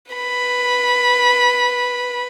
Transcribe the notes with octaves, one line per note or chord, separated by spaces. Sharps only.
B4 B5